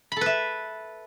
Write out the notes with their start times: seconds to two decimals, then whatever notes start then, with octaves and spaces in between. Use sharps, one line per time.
0.12 B5
0.16 A4
0.21 B4
0.26 E5